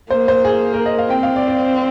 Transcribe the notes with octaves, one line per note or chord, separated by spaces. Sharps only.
A#3 C5
C5
G#4
A#4
D#5
F5
C4 G5
F5
D5
D5